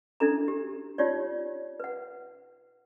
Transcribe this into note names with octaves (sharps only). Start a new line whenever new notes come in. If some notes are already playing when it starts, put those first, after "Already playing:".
D4 E4 A4 A#5
G4
D#4 F4 G4 C#5 D5
B4 F#5